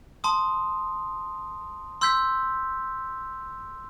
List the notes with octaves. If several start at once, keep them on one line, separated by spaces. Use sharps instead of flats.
A5 C6 D#6
C6 E6 G6 B6